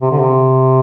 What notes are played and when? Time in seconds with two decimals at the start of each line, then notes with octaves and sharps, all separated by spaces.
0.02 C3
0.12 D3
0.20 C3